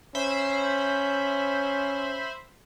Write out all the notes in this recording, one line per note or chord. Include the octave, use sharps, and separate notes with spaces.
C#4 C5 E5 B5